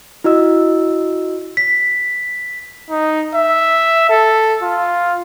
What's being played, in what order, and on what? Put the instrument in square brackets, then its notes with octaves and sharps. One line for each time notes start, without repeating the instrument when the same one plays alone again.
[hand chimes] E4 F#4 D#5 E6
[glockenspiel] B6
[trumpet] D#4
E5
A4
F4